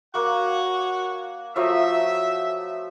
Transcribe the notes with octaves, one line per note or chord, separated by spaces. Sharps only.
A#3 F#4 C#5 F#5
F3 F#3 A3 E5